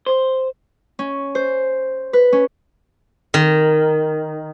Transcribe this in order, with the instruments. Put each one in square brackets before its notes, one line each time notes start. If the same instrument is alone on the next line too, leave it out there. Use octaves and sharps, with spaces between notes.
[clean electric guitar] C5
[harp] C#4
C5
B4
C#4
[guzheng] D#3